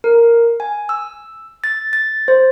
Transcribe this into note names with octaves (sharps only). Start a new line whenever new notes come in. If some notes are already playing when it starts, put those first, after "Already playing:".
A#4
G#5
E6
A6
A6
C5